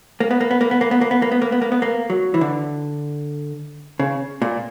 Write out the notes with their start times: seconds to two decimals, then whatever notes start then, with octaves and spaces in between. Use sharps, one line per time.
0.20 A#3
0.31 B3
0.41 A#3
0.51 B3
0.61 A#3
0.71 B3
0.81 A#3
0.91 B3
1.01 A#3
1.11 B3
1.22 A#3
1.32 B3
1.42 A#3
1.52 B3
1.62 A#3
1.72 B3
1.82 A#3
2.10 F#3
2.34 E3
2.41 D3
4.00 C#3
4.42 A#2